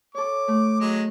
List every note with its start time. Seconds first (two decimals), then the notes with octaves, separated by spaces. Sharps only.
0.15 A4 C#5 D6
0.48 A3
0.80 F#3 G#3